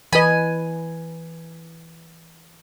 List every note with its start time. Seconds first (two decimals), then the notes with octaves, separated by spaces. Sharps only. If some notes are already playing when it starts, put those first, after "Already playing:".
0.13 E3 B4 D#5 G#5 B5